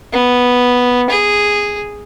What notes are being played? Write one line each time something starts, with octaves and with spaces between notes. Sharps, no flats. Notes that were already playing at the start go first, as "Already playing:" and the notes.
B3
G#4